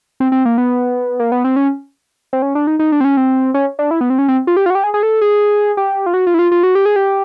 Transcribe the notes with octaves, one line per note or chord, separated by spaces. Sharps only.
C4
C4
A#3
B3
A#3
B3
C4
C#4
C4
C#4
D4
D#4
D#4
D4
C4
C#4
C4
C#4
D4
E4
B3
C4
C#4
C4
F4
G4
F4
F#4
G4
G#4
G#4
A4
G#4
G4
F4
F#4
F4
E4
F4
F4
F#4
G4
G#4
G4